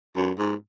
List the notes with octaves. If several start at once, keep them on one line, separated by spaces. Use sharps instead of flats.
F#2
G#2